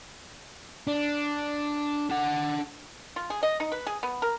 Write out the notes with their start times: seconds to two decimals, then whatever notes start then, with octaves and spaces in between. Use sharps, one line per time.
0.87 D4
2.10 D4 F#5
3.16 F4
3.30 G#4
3.43 D#5
3.60 D#4
3.72 B4
3.87 G#4
4.03 B3
4.22 A#4